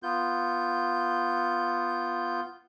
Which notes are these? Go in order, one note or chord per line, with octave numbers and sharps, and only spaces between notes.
B3 F4 G6